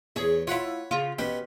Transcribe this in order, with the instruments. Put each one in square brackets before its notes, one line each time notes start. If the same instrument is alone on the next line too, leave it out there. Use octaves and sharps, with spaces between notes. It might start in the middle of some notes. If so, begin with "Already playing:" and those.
[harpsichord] E2 C#5 [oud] G#4
[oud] E4 F4 [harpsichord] C#5 F#5 B5
[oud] C#3 F4
[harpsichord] B2 G4 B4 [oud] C#4